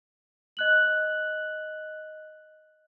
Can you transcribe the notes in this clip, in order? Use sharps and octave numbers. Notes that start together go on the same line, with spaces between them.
D#5 F#6 F#7